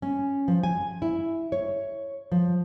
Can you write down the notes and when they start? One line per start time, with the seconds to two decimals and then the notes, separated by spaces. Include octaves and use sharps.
0.02 C#4
0.48 F3
0.63 G#5
1.02 E4
1.52 C#5
2.32 F3